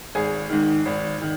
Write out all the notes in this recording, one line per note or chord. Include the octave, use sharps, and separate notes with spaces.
G#1 G#4
G#2 D#3
G#1
D#3